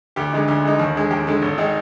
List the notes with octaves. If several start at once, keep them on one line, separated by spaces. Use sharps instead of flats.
D2 G4
D3 G#3 D#4
D2
D3 G#3 D#4
D#2
D3 G#3
D#2 G4
D3 G#3
G#1
D#3 G#3 D#4